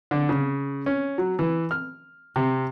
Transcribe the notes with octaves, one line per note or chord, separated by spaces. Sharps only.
D3
C#3
C#4
F#3
E3
F6
C3